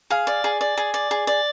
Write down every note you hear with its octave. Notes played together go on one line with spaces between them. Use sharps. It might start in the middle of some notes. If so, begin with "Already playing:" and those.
G#4 F5
D5
G#4
D5
G#4
D5
G#4
D5